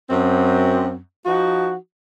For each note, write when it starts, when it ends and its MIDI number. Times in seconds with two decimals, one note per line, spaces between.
0.10 0.98 42
0.10 0.98 60
1.26 1.75 53
1.26 1.75 63
1.26 1.75 66